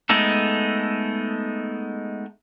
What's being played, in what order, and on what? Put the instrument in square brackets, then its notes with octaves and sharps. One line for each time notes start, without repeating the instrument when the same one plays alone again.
[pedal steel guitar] G#3 A3 B3 D#4 A4